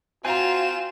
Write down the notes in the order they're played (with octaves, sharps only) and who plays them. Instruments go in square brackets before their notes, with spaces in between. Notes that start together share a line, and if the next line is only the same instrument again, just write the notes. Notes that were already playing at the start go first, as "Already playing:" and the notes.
[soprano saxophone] C4 [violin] F4 E7 [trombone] F#4 [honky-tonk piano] G#5 A#5